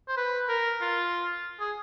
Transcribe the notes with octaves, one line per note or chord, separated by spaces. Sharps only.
C5
B4
A#4
F4
G#4